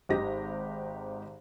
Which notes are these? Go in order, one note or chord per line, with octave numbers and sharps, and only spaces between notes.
G#1 D#4 G4 D#5 A#6